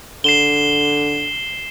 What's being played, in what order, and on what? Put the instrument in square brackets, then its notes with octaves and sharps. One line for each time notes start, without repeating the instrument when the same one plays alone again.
[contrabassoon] D3 [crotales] C7 E7 G7